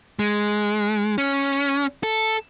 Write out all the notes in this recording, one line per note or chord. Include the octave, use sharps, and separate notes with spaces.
G#3
C#4
A4